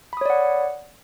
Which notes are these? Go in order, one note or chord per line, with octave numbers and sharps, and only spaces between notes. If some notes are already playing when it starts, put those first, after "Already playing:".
C#5 D5 F#5 B5 D#6